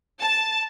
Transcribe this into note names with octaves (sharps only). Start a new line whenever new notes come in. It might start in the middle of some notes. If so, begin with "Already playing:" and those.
A5